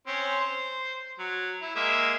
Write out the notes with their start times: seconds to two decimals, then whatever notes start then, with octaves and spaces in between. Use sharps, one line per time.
0.07 C4 C#4
0.41 C5
1.19 F#3
1.62 E4
1.76 G#3 A#3 E5